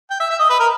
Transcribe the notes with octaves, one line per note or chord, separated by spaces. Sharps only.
G5
E5
E5
D#5
B4
A#4